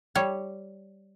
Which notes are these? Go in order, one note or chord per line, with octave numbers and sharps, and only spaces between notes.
G3 C#5